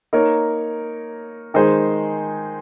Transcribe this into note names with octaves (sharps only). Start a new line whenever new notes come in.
A#3 D#4 A#4 C#5
D#3 G#3 D#4 G#4 C5